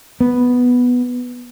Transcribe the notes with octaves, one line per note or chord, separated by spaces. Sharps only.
B3